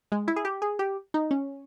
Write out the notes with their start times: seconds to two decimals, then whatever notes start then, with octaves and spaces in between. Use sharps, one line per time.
0.12 G#3
0.28 E4
0.36 G#4
0.45 G4
0.62 G#4
0.79 G4
1.14 D#4
1.31 C#4